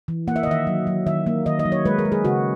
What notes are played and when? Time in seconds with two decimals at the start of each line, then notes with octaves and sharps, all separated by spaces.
0.08 E3
0.28 A#3 F#5
0.36 E5
0.43 D#5
0.47 D#3 E5
0.67 F#3
0.87 F#3
1.06 D#3 E5
1.26 A#3
1.46 D#3 D#5
1.59 D#5
1.65 F#3
1.72 C#5
1.85 G#3 B4
1.99 A#4
2.05 G#3
2.12 G#4
2.25 C#3 F#4